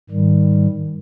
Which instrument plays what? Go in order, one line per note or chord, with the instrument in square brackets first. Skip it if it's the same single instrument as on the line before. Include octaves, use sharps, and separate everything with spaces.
[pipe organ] G#2 D#3 G3